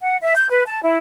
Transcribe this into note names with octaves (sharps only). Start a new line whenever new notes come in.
F#5
E5
G6
B4
A5
E4